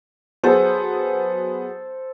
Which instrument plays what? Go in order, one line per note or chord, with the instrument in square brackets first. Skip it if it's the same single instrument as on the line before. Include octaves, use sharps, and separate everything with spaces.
[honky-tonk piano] F#3 B3 G#4 [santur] A4 C5